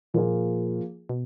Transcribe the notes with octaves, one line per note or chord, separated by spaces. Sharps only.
A#2 F3 A#3 F4 G#4
B2